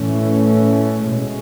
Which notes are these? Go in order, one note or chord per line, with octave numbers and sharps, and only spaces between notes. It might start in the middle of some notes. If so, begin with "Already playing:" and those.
Already playing: A2 E3 A3 C#4
B2 G#3 C#4